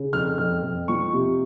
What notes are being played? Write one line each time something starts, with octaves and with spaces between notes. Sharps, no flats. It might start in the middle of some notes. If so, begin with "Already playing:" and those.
Already playing: C#3
F2 F6
F2 F6
F2
F3 C#6
C3